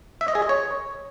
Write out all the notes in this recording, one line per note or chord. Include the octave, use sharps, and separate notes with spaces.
E5
D#5
G#4
D#5
C#5